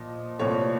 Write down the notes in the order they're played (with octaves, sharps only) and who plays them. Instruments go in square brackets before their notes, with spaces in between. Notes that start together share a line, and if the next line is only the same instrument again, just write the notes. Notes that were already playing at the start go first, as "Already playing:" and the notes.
Already playing: [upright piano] A#2 F3 D#5
C2 A#2 F3 A3 C#5